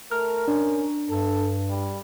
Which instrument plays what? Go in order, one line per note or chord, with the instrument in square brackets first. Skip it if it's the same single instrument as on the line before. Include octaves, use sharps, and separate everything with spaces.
[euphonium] A3 [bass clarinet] A#4 [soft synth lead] F6
[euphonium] C#4 [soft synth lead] D4
[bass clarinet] G2 [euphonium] A4
[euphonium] G3